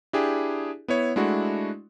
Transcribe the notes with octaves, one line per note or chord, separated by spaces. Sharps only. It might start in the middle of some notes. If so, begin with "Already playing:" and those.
D4 E4 G4 G#4
B3 E4 C#5
G#3 A3 D4 E4 F#4